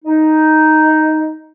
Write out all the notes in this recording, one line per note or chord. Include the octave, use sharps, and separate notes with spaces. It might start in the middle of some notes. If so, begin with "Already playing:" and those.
D#4